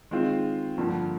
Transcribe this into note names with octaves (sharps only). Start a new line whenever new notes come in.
D#3 G#3 C4 F4
G2 D3 F3 A#3